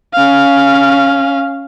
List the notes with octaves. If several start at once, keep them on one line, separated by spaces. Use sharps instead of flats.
C#4 F5